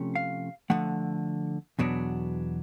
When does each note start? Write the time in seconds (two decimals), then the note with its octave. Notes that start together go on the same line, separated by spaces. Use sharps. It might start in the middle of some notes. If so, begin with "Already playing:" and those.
Already playing: C3 F3 A3 C#4
0.15 F5
0.70 D3 F3 A3 F#5
1.79 E2 B2 F#3 B3 D4